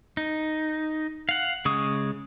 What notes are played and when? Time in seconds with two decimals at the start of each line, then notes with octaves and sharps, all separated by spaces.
0.17 D#4
1.29 F5 F#5
1.65 C#3 G#3 C#6 D#6